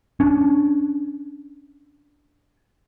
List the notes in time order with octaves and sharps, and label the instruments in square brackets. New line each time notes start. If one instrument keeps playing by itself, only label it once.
[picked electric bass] C#4 D4